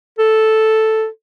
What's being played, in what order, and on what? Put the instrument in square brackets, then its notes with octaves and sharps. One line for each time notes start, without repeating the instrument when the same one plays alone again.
[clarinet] A4